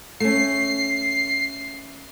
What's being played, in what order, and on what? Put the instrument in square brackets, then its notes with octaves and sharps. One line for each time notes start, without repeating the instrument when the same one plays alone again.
[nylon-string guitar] A3 C#4 [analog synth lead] C7